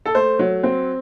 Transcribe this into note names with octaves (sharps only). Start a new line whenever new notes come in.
A4
A3 C5
F#3
C4